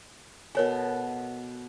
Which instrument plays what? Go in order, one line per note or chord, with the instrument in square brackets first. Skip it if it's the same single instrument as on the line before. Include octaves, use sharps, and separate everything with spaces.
[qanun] B2 B3 A4 [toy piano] A#4 C#5 G#5